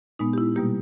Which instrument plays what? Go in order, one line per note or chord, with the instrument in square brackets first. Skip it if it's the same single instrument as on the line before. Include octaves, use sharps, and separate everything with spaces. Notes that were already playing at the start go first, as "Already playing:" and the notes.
[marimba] A#2 G#3 B3 D#4
G4
E4
B2 G3 A#3 G4